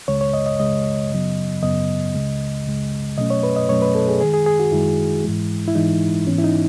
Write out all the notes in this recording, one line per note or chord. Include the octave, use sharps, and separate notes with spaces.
C#2 C#3 G#3 C#5
C#5
D#5
D#5
C#2 C#3 G#3 D#5
F#2 C#3 F#3 B3
F#2 C#3 F#3 B3 D#5
C#2 C#3 G#3
C#2 C#3 G#3
B2 F#3 A3 C#4 D#5
C#5
B4
D#5
B2 F#3 A3 C#4 C#5
B4
A4
G#4
F#2 D#3 G#3 G#4
G#4
G#4
F#4
F#2 D#3 G#3 E4
G#2 E3 G#3
E4
G#2 E3 G#3 D#4
G#2 E3 B3 C#4
E4
D#4